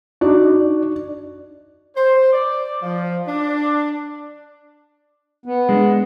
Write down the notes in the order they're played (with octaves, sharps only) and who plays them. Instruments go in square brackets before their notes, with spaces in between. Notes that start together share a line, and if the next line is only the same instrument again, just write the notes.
[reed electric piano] D4 D#4 D5 [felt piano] F#4
[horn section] C5
D5
F3
D4
[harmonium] B3
[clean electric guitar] G#3 D4